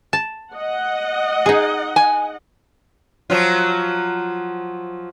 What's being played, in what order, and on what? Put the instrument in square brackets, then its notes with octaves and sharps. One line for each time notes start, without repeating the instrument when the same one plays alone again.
[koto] A5
[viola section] D#5 F#5
[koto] D#4 G#4
[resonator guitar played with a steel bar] G#5
[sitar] F3 F#3 F4